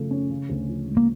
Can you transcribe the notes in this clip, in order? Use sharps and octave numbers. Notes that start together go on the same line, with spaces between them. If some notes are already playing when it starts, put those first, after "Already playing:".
Already playing: C#3 F3 A3
C#4
C#3
D2
F3
G#3
A#3